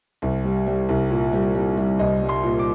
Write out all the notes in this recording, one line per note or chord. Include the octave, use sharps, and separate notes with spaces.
C2
G3
G3
C2
A#2
G3
G3
G3
C2 D#5
G3
C6
A#2
D6